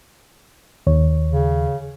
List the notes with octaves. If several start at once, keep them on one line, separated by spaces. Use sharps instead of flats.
D#2 C#5
C#3